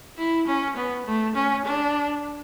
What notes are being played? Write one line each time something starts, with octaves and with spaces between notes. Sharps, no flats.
E4
C#4
B3
A3
C#4
D4